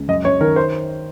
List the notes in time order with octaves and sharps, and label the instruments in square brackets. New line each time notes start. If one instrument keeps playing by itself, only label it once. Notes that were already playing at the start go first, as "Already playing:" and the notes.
Already playing: [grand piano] C#2
F#2 D#5
F#2 C#5
D#3 A#4
C5